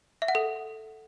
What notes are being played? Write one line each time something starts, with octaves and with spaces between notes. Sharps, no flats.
E5
F#5
A4